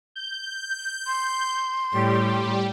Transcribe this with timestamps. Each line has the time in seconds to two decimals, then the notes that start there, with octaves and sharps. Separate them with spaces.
0.15 G6
1.07 C6
1.93 A2 G3 G4